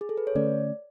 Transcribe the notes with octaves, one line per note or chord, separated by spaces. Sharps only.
G#4
A4
B4
C#5
D3 A3 C#4 D5